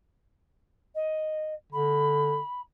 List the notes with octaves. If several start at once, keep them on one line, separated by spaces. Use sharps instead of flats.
D#5
D3 B5